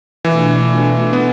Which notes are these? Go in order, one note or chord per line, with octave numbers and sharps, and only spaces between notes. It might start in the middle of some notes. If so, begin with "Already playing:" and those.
B2 E3 A3 D4 F4
B3